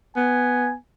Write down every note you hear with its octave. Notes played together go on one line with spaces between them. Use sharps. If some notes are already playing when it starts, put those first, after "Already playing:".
B3 G#5